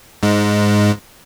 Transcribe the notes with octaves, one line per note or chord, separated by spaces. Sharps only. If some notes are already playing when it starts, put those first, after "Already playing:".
G#2 G#3